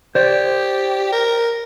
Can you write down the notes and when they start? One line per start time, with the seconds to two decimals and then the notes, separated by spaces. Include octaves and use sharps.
0.15 G4 C5 D5
1.12 A#4